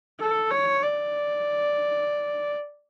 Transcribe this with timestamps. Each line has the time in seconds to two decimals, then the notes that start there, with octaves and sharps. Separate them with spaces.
0.20 A4
0.51 C#5
0.83 D5